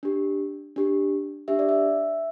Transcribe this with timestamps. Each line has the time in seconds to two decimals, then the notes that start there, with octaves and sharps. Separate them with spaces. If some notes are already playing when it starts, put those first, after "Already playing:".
0.03 D4 G4
0.76 D4 G4
1.48 D4 G4 E5
1.59 D5
1.69 E5